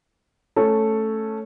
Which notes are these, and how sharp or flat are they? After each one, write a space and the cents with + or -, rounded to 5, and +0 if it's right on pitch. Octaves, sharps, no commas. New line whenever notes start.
A3 +0 C#4 +0 A4 +0